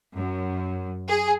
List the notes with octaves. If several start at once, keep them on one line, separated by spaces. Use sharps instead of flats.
F#2
G#4